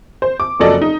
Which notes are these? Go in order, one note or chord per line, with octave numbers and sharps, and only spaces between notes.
C5
D6
F#1 F3 F#3 A4 D5 D#5
D#4